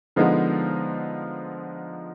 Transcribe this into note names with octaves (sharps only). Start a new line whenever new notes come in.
D3 F3 G#3 B3 D#4